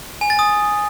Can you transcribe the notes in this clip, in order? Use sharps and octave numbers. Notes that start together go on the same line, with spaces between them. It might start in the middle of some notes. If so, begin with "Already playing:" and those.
G#5
A6
D#6